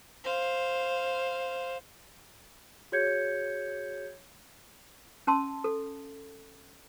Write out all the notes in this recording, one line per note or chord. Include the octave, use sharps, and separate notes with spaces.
C5 F5
F#4 G#4 C#5 G6 G#6 C#7
C#4 A5 C6 E6
A4